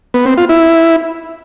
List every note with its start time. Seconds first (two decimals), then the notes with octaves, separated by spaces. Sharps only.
0.14 B3
0.26 C4
0.38 F4
0.49 E4